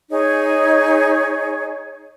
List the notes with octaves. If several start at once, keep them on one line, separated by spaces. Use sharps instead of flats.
D#4 G#4 C#5